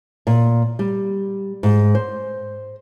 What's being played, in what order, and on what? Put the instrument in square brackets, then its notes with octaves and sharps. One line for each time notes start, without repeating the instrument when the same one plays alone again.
[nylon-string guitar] A#2
G3
G#2
C5